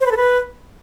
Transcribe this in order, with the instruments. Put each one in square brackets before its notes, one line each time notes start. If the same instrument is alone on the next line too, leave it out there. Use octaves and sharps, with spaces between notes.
[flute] C5
B4
A4
B4